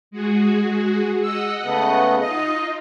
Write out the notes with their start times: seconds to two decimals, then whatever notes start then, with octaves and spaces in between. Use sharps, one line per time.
0.11 G#3 F#4 G#4
1.23 D#5 F#5 E6
1.65 C#3 A3 B3
2.21 D#4 F4 D#5